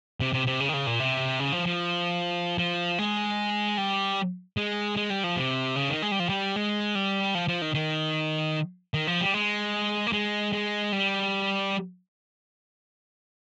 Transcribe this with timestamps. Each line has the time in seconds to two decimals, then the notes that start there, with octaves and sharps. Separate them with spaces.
0.20 C3
0.33 C3
0.47 C3
0.60 C#3
0.69 D#3
0.74 C#3
0.87 A#2
1.00 C3
1.40 C#3
1.53 F3
1.66 F3
2.58 F3
2.99 G#3
3.78 G3
4.57 G#3
4.97 G#3
5.10 G3
5.24 F3
5.37 C3
5.76 C#3
5.89 D#3
6.02 G#3
6.12 G3
6.20 F3
6.29 G3
6.56 G#3
6.95 G3
7.35 F3
7.48 F3
7.62 D#3
7.74 D#3
8.94 D#3
9.07 F3
9.21 G3
9.34 G#3
10.07 A#3
10.12 G#3
10.53 G#3
10.92 G3